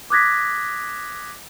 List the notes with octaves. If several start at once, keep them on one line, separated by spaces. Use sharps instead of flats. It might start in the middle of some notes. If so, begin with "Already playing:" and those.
D6 D#6 F#6 G#6 A#6 B6